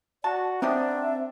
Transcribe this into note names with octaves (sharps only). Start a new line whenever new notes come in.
F#4 D5 A5
B3 C4 D4 D#4 G4 E5